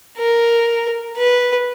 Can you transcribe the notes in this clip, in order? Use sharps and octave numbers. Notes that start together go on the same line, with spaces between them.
A#4
B4